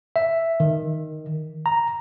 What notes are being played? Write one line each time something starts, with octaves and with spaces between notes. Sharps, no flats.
E5
D#3
A#5